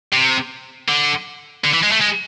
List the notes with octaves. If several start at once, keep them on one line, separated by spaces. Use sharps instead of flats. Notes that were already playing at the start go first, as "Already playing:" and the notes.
C3
D3
D3
E3
G#3
A3
G#3